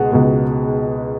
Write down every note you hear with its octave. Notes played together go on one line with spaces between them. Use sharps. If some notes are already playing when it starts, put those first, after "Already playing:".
Already playing: C#2 B2 G#3 F#5
C#2 B2 G#3